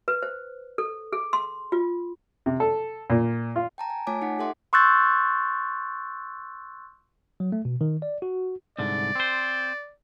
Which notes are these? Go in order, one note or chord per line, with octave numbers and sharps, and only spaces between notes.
B4
C5
A4
G#4
C6
F4
C3
A4
A#2
F4
G5 A5 A#5
G#5
A3 F4 C#5 G#5 A5 D6
D#4 F#5 B6
G4 A4 E5 F#5 C6 D6
C6 C#6 E6 F#6 G6 A6
F#3
A3
B2
D#3
D5
F#4
C2 G#2 D3 D5
C4 C5